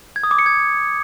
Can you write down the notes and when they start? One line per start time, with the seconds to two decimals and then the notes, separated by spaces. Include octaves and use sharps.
0.16 G#6
0.23 D#6
0.31 D6
0.39 C#7
0.46 G#6